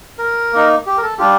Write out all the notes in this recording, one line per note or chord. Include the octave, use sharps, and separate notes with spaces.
A#4
A#3 D#4
G4
A#4
A4
G3 D4 F4 G4